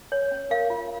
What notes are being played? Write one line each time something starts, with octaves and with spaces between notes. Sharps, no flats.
C#5
C#4
A#4 F5
F4